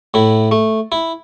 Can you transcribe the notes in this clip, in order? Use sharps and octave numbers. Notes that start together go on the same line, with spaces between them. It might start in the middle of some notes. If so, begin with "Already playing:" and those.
A2 E4
A3
E4